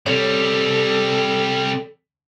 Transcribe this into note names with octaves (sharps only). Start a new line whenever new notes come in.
C3 G3 A4 C#5